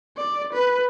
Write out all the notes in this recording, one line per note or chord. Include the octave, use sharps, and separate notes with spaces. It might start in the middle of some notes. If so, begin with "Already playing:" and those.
D5
B4